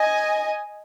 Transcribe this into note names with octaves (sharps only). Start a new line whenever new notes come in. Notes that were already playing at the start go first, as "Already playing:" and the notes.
Already playing: D#5 G#5